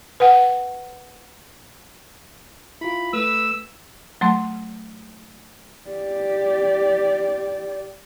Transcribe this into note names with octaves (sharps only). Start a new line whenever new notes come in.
B4 F#5
E4 F4 B5
A3 B4 E6
F#3 A3 C6
G4 D5